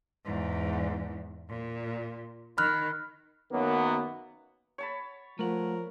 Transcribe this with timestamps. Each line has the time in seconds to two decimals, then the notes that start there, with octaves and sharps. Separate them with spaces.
0.25 E2 G#2
1.49 A#2
2.58 D#3 B5 F6 F#6
3.52 F#2 D#3 F#3 A#3 B3
4.78 C#5 A5 B5
5.39 F3 A3 A#4 F#5